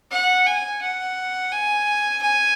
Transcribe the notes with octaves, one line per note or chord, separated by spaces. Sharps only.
F#5
G#5
F#5
G#5
G#5